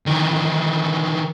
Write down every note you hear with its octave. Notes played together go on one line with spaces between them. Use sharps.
D#3 E3